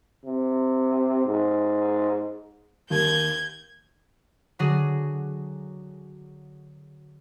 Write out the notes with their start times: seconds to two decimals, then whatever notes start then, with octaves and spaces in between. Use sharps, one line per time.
0.25 C3
1.26 G#2
2.90 D#2 G6 G#6
4.59 D3 F#3 F#4 G#4